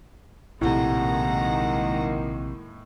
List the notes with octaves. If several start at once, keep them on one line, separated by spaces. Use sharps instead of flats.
A#1 A2 C3 D#3 G#3 A#3 F#5 A#5